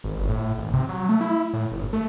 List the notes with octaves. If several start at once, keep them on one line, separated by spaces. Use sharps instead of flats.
G#1
G1
A2
G#1
C3
F#3
A3
E4
A2
G1
A3